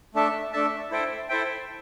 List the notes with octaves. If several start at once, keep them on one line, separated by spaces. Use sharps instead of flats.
A3 D4 A4 E5 A5
A3 D4 A4 E5 A5
E4 A4 C5 E5 G5
E4 A4 C5 E5 G5